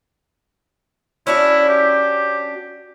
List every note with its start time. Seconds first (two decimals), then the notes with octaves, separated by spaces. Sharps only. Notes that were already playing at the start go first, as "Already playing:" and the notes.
1.27 C#4 D4 E4 F#4
1.69 G4